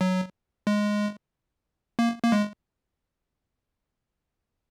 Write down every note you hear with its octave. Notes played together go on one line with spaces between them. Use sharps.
F#3
G#3
A#3
A#3
G#3